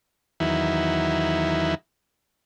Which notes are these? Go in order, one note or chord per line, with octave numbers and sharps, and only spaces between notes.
E2 D#3 F#3 E4